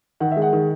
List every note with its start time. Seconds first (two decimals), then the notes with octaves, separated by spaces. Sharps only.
0.20 D#3 F#5
0.32 E5
0.37 G#3
0.42 F#5
0.53 D#3